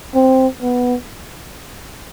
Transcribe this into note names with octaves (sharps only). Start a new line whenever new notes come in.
C4
B3